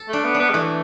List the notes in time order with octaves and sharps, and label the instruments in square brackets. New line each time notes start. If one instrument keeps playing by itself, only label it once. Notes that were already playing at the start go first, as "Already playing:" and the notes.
Already playing: [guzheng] A4
[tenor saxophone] A3 [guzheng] D4
[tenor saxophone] B3
[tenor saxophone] B3 [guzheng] D4
[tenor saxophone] G3
[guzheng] E3 [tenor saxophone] A3